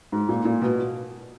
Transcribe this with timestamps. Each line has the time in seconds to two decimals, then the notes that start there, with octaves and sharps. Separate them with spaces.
0.12 G#2
0.29 A#2
0.45 A#2
0.62 B2